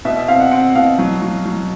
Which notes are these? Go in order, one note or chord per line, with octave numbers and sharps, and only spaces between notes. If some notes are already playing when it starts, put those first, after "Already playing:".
B2 E5
E5
C4 F5
F#5
C4 F#5
B2 F5
F#3
F#3
F#3